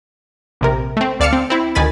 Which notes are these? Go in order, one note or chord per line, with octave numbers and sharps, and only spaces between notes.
A#1 C3 A#4
A3 C4
D2 D5 F5 A5 F6 C#7
C4
C4 E4
D2 D#3 G#5 B5 A6